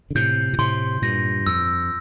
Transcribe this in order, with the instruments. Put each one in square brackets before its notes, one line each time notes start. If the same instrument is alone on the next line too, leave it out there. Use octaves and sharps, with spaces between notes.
[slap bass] D3
[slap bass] A2 C3 [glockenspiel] G6
[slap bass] A#2
[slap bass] A2 C3 [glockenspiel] C6
[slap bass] G2 A#2 [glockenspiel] A#6
[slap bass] F2 [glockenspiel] E6